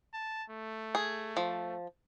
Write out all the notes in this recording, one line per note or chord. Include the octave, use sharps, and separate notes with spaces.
A5
A3
G#4
F3